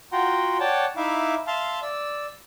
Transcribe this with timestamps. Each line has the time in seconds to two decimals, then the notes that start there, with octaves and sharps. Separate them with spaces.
0.12 F4 F#4 F#5 G5 A#5 C6
0.60 C#5 D5 F#5 G5 A5
0.97 D#4 E4 E5 F5 D6
1.47 E5 F5 A5 C6 F6
1.82 D5 E6